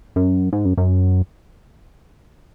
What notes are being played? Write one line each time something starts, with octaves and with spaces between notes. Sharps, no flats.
F#2
G#2
F#2
F#2